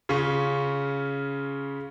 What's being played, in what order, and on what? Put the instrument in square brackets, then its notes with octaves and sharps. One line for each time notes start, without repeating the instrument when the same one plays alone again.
[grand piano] C#3 C#4 F4 C#6